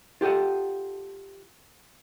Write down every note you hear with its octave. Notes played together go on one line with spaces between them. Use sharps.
F4 G4 A4 D#5 F#5